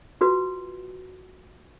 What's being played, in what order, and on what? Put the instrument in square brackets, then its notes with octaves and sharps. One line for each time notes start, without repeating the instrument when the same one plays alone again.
[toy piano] F4 F#4 B4